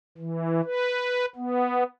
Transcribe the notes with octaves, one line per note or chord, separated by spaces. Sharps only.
E3
B4
B3